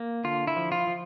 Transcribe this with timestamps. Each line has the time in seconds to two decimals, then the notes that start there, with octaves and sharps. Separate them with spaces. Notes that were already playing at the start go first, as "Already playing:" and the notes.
Already playing: A#3
0.24 D3 F4
0.47 E4
0.56 F3
0.72 F4
0.87 F3